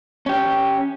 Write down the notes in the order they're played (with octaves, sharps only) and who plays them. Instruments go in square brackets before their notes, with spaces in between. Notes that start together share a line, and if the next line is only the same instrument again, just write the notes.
[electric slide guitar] C#4 G4